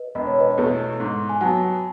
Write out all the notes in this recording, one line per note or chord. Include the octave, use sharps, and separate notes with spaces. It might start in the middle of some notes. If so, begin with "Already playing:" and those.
Already playing: B4 D#5
E1 D#5
C#5
B4 D#5
E2 B2 A3
G#2
G#5
F#3 B3 F#5 A5